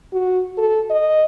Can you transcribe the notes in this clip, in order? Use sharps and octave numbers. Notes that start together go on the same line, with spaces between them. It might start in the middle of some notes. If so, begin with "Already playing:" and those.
F#4
A4
D#5